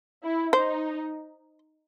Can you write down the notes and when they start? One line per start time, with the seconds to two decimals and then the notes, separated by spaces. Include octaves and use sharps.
0.23 E4
0.53 D#4 C5